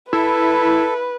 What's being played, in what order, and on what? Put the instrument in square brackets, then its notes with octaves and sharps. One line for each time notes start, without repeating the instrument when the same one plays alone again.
[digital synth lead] E4 [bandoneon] A4 [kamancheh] B4